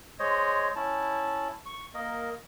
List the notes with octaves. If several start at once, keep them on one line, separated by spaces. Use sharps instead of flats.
G#3 C5 C#5 D#5
C#4 E4 A5
C#6
A#3 A#4 D#5